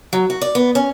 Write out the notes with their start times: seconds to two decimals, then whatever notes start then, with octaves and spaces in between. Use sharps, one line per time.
0.13 F#3
0.30 F#4
0.42 D5
0.55 B3
0.75 C#4